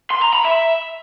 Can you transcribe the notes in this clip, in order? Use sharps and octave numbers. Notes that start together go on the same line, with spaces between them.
C6
A#5
B5
E5